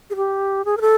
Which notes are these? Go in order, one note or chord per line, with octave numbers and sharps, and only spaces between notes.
G#4
G4
G#4
A#4
A4